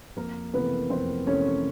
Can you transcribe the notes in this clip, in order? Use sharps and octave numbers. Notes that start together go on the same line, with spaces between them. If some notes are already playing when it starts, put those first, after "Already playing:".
F2 A#3 A#4
C3 E3 A3 B3 B4
F2 C4 C5
C3 E3 A3 C#4 C#5